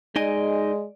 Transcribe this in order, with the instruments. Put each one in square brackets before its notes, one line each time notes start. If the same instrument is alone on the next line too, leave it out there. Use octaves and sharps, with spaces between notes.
[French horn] G#3 [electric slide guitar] D#4 D#5 G#5 [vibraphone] D5